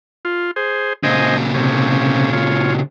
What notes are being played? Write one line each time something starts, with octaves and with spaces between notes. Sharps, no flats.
F4
G#4 C5
A#2 C#3 C5 D#5 G#5
C3 C#4
F4 C#5